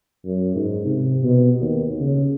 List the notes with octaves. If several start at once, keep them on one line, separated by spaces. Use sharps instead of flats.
F#2
G#2
C3
B2
D#2
C#3